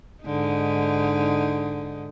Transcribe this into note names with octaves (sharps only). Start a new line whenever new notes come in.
G#2 D3 D#4